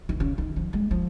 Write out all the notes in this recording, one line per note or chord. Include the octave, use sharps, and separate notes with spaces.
D#3
C#3
D#3
F3
G#3
F3